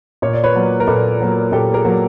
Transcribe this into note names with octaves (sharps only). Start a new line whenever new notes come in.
A#2 C#5
D5
B4 C#5
F#3 A#3
A#4
A#2 A4 B4
F#3 A#3
A#2 G4 A4
G#4 A#4
F#3 A#3